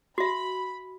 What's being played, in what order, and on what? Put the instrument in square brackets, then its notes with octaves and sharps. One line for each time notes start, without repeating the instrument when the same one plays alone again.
[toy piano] F#4 E5 [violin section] B5